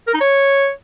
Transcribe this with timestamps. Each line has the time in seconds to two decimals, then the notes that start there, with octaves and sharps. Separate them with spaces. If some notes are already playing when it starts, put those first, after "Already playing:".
0.08 A#4
0.14 D#4
0.21 C#5